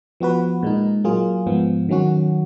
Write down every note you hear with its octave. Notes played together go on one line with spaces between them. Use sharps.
F3 B3 F#4 B4
A#2 G#3 D#4
F#3 A#3 F4 G#4
G#2 F3 B3
D#3 F#3 C#4 F#4